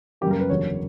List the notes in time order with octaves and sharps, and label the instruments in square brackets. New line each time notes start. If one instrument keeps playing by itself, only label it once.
[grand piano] F#2 C#3 G3 A#3 G4
A#4
B4
F#1 E2 D3 F#3 C#5